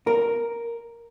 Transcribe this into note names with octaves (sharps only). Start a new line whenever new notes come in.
A#4